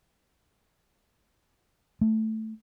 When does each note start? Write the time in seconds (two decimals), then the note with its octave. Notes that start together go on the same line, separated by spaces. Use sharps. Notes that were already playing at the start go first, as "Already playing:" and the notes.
2.01 A3